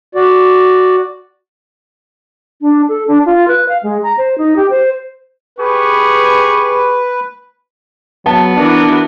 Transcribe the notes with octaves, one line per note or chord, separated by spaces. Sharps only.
F#4 D5
D4
A4
D4
F4
B4
F5
G#3
A#5
C5
D#4
G4
C5
G4 G#4 B4 C#6
F#3 B3 A5
E3 D4 F#4 A#4